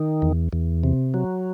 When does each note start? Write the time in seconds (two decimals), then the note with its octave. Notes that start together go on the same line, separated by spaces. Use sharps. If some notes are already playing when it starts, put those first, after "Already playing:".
Already playing: D#3
0.22 E2
0.53 E2
0.84 C3
1.14 F#3